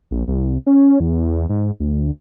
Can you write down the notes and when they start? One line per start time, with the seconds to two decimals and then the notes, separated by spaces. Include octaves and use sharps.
0.11 A#1
0.28 C2
0.67 C#4
1.00 E2
1.49 G#2
1.80 D2